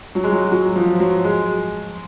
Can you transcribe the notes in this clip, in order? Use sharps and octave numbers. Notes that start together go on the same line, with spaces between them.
F#3
G#3
F#3
F#3
F3
F#3
G#3